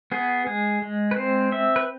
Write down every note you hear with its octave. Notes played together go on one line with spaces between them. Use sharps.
B3 G#4
G#3 G#4
G#3
B4
C4 C5
C4 E5
B4